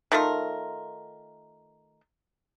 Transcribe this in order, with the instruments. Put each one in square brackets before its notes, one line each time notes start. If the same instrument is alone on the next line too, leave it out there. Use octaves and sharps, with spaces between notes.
[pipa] D#3 A3 F4 A#4